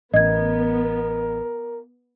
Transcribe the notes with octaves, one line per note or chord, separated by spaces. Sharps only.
A1 B3 A#4 D#5 G#6